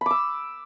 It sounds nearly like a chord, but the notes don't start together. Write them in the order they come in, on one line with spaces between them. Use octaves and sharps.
B5 D6 E6